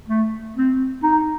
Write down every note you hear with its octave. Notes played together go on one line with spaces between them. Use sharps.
A3
C4
D#4